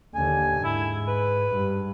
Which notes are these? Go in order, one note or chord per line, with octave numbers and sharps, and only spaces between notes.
D#2 D3 G#5
G#2 E4
B4
G2